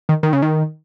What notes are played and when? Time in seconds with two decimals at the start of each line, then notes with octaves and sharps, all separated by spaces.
0.09 D#3
0.23 D#3
0.33 C#3
0.42 D#3